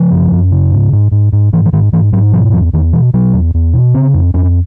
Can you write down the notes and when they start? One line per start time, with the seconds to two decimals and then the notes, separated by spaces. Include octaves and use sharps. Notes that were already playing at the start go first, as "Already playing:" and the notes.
Already playing: C#3 F3
0.12 F#2
0.32 F#2
0.52 C#3
0.72 G#2
0.93 G#2
1.11 G#2
1.32 G#2
1.53 G#2 E3
1.66 E3
1.73 G#2 D#3
1.93 G#2 E3
2.12 G#2 F#3
2.32 B2 F3
2.53 E2 F3
2.73 E2 D#3
2.93 B2 E3
3.14 B2 F#3
3.33 E2
3.54 E2
3.74 B2
3.94 C#3 C4
4.14 F2
4.34 F2 C#4